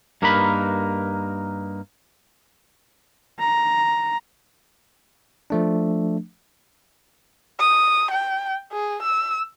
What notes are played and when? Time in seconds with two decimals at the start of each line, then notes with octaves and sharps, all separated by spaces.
0.22 G2 A#3 D#4 A#4 B4 B5
3.39 A#5
5.50 F3 A3 D4
7.60 D#6
8.11 G5
8.72 G#4
9.03 E6